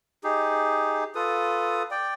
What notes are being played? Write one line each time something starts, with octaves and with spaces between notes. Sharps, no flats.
D#4 G4 G#4
F4 A4 B4 D#6
D5 G5